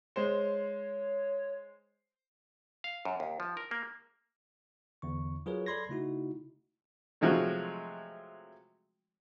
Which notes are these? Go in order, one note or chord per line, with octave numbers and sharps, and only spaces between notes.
G#3 C5 C#5
F5
F#2
D#2
F3
A#4
A#3
E2 D3 C#6
F#3 F4 G#4 A#4 B4 C#5
A4 D5 B5 C6 G#6 A#6
C#3 A3 D#4 E4 F#4
C3 F3 F#3 G#3 A3